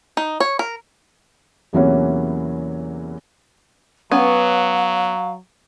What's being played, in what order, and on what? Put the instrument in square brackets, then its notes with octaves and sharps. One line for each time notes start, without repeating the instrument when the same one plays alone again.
[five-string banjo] D#4
C#5
A#4
[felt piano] E2 C3 E3 F#3 A#3 C#4
[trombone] F#3 [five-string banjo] B3 C#4 [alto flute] F5